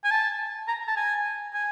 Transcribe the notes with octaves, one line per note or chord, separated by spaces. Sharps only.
G#5
A5
A#5
A5
G#5
G#5